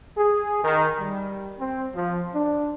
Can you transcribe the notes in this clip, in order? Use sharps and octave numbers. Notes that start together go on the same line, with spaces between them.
G#4
D#3
G3
C4
F3
D4